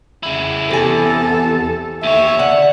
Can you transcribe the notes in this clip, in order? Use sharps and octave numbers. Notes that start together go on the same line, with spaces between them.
C#3 E4
E2 C3 A4 G#5
D#2 C#5 E5
D3 F#5